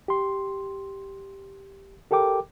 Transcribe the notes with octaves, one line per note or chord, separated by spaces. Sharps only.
G4 C6
G4 A4 A#4 G5 D6